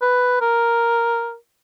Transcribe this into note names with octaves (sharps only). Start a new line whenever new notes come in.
B4
A#4